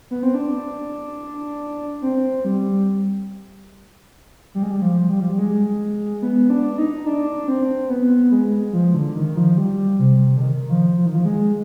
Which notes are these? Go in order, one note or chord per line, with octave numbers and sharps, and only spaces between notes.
B3
C4
D4
C4
G3
G3
G#3
G3
F3
G3
F3
G3
G#3
B3
D4
D#4
D4
C4
B3
G#3
F3
D3
D#3
F3
G3
C3
D3
D#3
F3
F3
D#3
F3
G#3